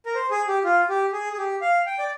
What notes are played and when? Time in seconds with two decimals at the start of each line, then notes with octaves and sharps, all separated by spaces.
0.06 A#4
0.15 C5
0.31 G#4
0.48 G4
0.64 F4
0.89 G4
1.13 G#4
1.33 G#4
1.38 G4
1.62 F5
1.86 G5
1.99 D5